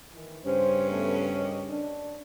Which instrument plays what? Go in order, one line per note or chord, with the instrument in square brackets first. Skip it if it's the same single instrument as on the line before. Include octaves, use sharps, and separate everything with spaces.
[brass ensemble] D#3 E3
[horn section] G2 C#3 C#4 [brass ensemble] C5
[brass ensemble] A3 B3
G4 A#4 D#5
D4